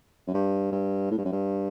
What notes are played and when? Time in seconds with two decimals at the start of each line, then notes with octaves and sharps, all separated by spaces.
0.28 F#2
0.34 G2
0.72 G2
1.10 A2
1.18 G2
1.25 F#2
1.32 G2